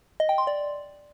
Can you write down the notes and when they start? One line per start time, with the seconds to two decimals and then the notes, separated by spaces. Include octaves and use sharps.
0.20 D#5
0.29 G5
0.38 C6
0.47 D5